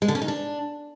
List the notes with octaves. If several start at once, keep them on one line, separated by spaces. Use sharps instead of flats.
G#3
D3
C#4
D#4
D4